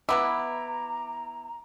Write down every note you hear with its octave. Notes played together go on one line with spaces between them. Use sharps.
E3 B3 E4 A#5 D6